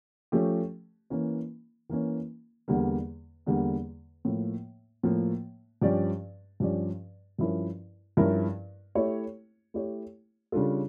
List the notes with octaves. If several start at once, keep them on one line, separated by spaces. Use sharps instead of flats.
F3 A3 C#4 G4
E3 A#3 C#4
E3 A#3 C#4
E2 D3 G3 A#3
E2 D3 G3 A#3
A2 F3 A#3
A2 F3 A#3
G2 F3 C#4 G4 D5
G2 F3 C#4 G4 D5
G2 F3 C#4 E4 A#4
G2 F3 C#4 E4 A#4
A3 E4 G4 C#5
A3 E4 G4 C#5
C#3 G3 D4 F4 A4